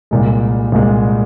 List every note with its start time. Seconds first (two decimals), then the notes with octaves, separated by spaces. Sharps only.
0.11 C2 A#2 G#3
0.72 C2 A#2 G#3